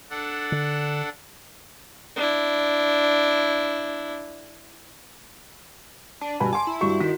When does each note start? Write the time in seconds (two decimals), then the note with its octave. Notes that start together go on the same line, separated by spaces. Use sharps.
0.10 D4 A4 F#5
0.52 D3
2.16 D4 E4
6.21 D4 A5
6.40 G2 B2 G#5 B5
6.53 G#5 C6 D6
6.67 E4
6.81 G2 F#4 C#6
7.00 D#3 E4 F#4 B6